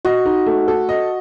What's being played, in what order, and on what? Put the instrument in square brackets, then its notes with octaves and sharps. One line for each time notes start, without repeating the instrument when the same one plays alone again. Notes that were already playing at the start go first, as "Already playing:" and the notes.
[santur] F#4 [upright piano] D#5
[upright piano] D#4
A3
A4
D#5